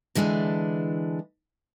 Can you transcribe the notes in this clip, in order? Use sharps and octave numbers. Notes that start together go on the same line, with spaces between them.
D3 E3 G#3 C4 D4